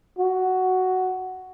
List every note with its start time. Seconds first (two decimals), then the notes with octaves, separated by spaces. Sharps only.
0.18 F#4